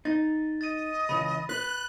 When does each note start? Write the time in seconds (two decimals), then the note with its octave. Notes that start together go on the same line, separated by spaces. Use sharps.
0.05 D#4 A6
0.61 D#5 A6 D#7
1.09 C#2 E3 B5
1.49 B4 F#6